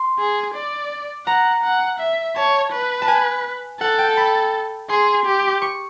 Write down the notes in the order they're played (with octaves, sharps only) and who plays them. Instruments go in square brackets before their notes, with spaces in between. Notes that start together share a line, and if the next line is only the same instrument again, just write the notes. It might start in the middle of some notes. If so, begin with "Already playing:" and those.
Already playing: [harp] C6
[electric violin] G#4
D5
[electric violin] F#5 [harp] A#5
[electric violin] F#5
E5
[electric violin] C#5 [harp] A5
[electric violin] B4
[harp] A5
G#5
[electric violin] A4 [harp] F#5
[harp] G5
B5
[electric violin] G#4 [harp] C6
[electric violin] G4
[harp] C#6